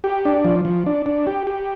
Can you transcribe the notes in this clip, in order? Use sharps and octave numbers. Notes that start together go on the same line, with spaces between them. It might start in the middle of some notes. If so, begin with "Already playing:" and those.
G4
D4
F3
F3
D4
D4
G4
G4